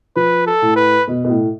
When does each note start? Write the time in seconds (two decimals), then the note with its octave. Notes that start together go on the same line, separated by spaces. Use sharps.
0.16 F3 B4
0.47 A4
0.62 A2
0.76 B4
1.08 B2
1.25 B2
1.30 A2